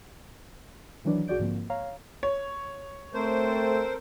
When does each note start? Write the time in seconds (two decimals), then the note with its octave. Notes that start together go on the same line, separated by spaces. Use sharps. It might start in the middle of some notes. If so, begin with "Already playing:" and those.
1.05 D#3 E3 F#3 D4 B4 D5
1.28 B1 F#4 G#4 D5 G6 D7
1.39 G#2 D3 F3 A#3 C4
1.70 C#5 F5 A#5
2.23 C#5
3.14 A3 C4 A4 A#4 C5